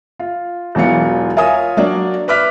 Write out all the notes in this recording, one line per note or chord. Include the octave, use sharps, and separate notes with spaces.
F4
E1 E3 F#3 B3 F4 C#7
F4 A#4 C#5 E5 G#5 D#6
F#3 A#3 D4 D5
B4 E5 D6 F6 B6